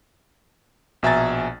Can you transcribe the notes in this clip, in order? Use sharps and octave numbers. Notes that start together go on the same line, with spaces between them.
A#1 B2 E5 G#5 A#5 A6